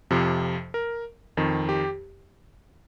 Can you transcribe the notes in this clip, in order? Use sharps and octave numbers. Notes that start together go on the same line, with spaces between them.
F2 C3 F3
A#4
F2 D#3
G4